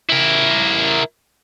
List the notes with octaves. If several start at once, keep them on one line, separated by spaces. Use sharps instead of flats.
E4 A#4